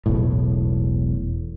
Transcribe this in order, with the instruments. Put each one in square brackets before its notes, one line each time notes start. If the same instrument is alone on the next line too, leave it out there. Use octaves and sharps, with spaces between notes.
[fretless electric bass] E1 B1 A2